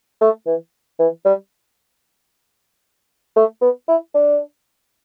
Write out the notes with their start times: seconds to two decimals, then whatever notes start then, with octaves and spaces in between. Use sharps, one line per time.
0.21 A3
0.46 E3
0.99 E3
1.25 G3
3.36 A3
3.62 B3
3.88 E4
4.14 D4